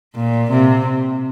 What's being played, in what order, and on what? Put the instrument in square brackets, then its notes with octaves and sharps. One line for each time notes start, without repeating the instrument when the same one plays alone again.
[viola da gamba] A#2
C3